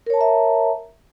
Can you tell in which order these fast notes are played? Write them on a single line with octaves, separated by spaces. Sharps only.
A#4 C#5 A5 A#5 E5